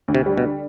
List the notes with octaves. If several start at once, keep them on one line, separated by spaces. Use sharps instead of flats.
D2
C3
G3
B2
D3